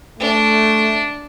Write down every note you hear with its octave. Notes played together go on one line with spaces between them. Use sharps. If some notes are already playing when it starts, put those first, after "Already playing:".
A3 D4